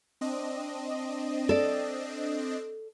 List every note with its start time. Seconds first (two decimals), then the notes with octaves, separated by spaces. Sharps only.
0.21 C4 D4 D#5
1.49 A4 D5